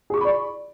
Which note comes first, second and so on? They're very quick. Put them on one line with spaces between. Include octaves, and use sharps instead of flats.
G#4 C#6 D6 B5 D5